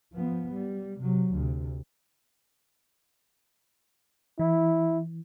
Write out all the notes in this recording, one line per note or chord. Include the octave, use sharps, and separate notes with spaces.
F3 B3
G3
C3 F#3
D2 C3
E3 E4